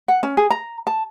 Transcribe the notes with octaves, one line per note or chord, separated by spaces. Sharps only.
F#5
C#4
G#4
A#5
A5